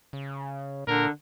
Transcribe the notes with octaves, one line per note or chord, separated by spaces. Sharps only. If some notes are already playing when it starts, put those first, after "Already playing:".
C#3
A#2 D3 A#4